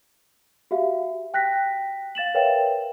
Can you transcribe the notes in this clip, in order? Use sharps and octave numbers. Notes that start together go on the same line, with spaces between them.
F#4 G4 E5 F5
G5 F#6 A#6 B6
F5 A6 E7 F#7
A#4 B4 C#5 E5 F5 G5